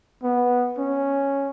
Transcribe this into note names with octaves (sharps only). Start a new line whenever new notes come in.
B3
C#4